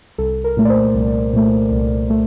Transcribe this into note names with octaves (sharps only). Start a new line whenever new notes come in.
C2 A4
A#4
A#2 A3
D5
C5
C2
A#2 A3
C2
A3